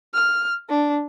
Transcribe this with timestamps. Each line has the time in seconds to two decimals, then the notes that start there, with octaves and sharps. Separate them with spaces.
0.14 F6
0.69 D4